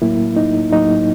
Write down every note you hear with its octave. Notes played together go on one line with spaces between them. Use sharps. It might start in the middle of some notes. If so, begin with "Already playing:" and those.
A2 F#3 A#3 E4
D#4
A2 F#3 A#3 D#4